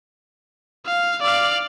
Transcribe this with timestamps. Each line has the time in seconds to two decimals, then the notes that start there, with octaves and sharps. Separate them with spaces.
0.86 F5
1.21 D5 F5